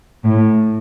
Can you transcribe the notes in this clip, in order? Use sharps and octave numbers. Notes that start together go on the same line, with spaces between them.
A2